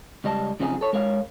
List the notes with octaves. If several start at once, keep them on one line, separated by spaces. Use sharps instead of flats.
C#2 G3 D#5 A5
F#2 C#3 F3 C4 D#4 G#4
A4 C#5
G#3 A#4 C#5 F5